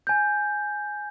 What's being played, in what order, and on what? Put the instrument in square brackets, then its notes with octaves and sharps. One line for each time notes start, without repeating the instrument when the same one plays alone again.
[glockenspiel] G#5 G6